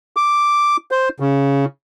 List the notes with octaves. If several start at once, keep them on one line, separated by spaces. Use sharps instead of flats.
D6
C5
C#3